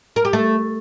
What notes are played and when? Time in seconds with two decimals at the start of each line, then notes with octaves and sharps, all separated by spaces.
0.16 A#4
0.25 G4
0.33 A3